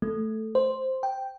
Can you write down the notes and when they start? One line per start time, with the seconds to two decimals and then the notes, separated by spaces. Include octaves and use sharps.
0.02 A3
0.55 C5
1.03 G5